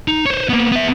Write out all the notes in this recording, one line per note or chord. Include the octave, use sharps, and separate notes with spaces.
D#4
C5 C#5
A#3 B3
B3 E5